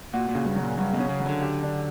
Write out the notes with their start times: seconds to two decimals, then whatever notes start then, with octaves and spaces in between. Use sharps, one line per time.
0.13 A#2 F#4
0.29 A#2
0.35 C#3
0.46 G2
0.56 F#3
0.62 A#2
0.78 G2 F#3
0.93 B2
0.99 C#4
1.09 C#3
1.20 F#3
1.26 D3
1.42 G4
1.63 D4